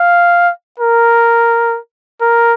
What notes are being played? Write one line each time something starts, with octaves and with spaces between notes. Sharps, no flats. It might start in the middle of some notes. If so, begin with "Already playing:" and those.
Already playing: F5
A#4
A#4